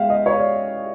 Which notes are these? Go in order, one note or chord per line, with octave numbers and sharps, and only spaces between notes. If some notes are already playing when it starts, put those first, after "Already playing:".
Already playing: G#3 E5 F5 G5
D#5
C#5
D5